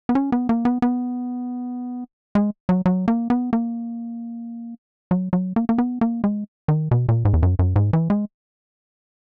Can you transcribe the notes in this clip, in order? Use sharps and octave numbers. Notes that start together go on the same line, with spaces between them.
B3
C#4
B3
A#3
B3
B3
G#3
F#3
F#3
A#3
B3
A#3
F#3
F#3
A#3
A#3
B3
A#3
G#3
D#3
B2
A#2
G#2
E2
F#2
F#2
G#2
E3
G#3